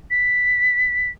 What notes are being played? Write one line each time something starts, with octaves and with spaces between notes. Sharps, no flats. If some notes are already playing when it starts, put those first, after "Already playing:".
B6